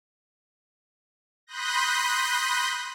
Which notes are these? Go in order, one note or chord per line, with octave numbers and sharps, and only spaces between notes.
B5 C6 D#6 F#6 G6 A#6